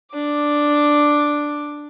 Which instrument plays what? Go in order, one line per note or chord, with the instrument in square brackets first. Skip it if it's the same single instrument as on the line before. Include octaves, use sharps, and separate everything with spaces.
[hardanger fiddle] D4 D6